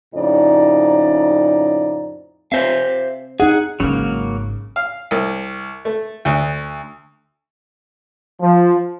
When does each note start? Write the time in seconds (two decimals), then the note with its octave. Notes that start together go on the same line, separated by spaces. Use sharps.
0.14 F2 A2 C#3 D#4 D5
2.52 C4 C5 E5 F5
3.40 D#4 G#4 F#5
3.80 G#1 G#2 C#3 F#3 A#3
4.76 F5
5.11 C2
5.85 A3
6.25 D2
8.41 F3